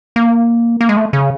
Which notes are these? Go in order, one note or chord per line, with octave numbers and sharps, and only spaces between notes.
A#3
A#3
G#3
A3
C#3